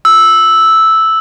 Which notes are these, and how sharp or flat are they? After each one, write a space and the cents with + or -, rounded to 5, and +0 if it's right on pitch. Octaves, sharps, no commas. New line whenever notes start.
E6 -5